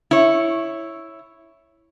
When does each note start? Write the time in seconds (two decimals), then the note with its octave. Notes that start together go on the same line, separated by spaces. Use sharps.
0.11 E4 C#5